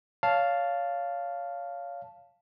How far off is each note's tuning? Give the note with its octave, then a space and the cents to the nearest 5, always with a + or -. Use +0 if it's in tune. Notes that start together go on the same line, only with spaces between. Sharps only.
C#5 +25 F5 +0 A5 +0